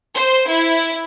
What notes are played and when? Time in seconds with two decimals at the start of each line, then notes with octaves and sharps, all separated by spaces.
0.15 C5
0.48 E4